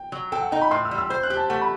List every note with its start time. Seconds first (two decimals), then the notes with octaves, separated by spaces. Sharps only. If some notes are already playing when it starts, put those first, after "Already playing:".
Already playing: G5
0.12 F#3
0.32 A4 G5
0.41 F#5
0.51 D#4 G5
0.61 B5
0.71 A2 C6
0.85 E6
0.91 G3
0.98 E6
1.10 C5 G6
1.23 F#6
1.30 G4
1.37 A5
1.49 A3 F#5
1.61 B5